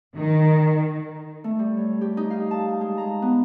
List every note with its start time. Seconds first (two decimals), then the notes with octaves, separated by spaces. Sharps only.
0.16 D#3
1.44 A3
1.59 G3
1.77 C#5
2.01 G4
2.17 D#4
2.30 F5
2.51 A5
2.81 G#3
2.98 A#5
3.22 B3